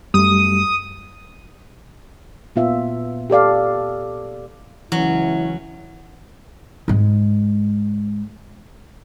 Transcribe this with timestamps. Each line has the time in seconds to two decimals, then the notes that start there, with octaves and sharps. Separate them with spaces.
0.14 F#2 G3 A3 D#6
2.56 A#2 B3 F4 E5
3.30 G4 A4 D5 F5
4.92 C#2 E3 F#3 C#4 E4
6.88 G#2 G#3